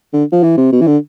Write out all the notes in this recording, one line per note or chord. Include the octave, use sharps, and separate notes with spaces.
D3
F3
E3
C3
B2
E3
D3